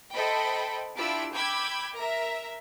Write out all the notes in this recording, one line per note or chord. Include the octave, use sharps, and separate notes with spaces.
A4 C5 D#5 E5 G5 B5
D4 E4 F4 G4 E6 D7
G5 B5 D6 E6 G6 G#6
A#4 E5 A#5